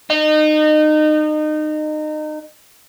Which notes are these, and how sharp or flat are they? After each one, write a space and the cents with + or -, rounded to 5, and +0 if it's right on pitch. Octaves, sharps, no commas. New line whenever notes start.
D#4 -25